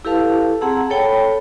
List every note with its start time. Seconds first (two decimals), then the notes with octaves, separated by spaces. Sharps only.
0.05 E4 G4 A4 B4 F5 A5
0.61 C4 G#4 F#5 A5 A#5 E6
0.90 A4 C#5 G5 A5 B5